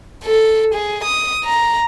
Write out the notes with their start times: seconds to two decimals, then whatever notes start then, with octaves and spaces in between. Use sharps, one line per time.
0.24 A4
0.74 G#4
1.04 D#6
1.44 A#5